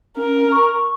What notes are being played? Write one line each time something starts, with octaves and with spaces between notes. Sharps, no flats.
C#4 A#4
C#6